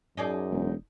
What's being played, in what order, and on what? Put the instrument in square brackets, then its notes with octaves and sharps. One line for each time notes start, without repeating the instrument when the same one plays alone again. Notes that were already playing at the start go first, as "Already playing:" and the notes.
[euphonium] F#2 [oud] D#4 G#4 D5
[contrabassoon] E1